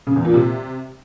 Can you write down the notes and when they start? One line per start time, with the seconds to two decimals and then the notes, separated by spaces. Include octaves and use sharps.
0.07 C#3
0.16 E2
0.25 A#2
0.34 C3